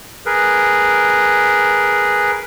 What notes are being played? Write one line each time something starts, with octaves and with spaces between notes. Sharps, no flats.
G#4 A#4 B4